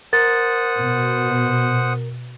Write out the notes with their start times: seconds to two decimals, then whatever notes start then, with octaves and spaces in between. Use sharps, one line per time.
0.13 A#4 C5 F#5 D#6 A6
0.79 B2